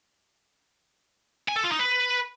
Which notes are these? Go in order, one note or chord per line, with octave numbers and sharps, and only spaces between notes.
G#5
A4
F4
D#4
B4